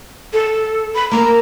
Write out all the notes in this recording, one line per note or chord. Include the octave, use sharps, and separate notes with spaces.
A4
B5
A#3 A4 A#4 A#5